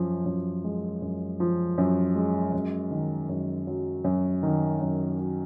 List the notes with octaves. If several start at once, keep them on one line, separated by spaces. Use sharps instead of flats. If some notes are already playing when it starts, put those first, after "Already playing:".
Already playing: F#2 F3
F#2
G#3
F#2
F3
F#2
G#3
F#2
D#3
F#2
F#3
F#2
D#3
F#2
F#3